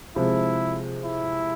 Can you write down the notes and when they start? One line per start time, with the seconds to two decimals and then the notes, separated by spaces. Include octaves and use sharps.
0.16 C3 F3 G#3 E4
1.05 E4